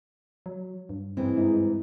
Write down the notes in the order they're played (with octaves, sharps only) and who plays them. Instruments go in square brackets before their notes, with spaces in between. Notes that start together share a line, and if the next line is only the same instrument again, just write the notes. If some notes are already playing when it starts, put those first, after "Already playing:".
[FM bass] F#3
G2
[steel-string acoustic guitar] G#2 E3 [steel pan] G#3 C4
[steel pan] G#3 D#4 E4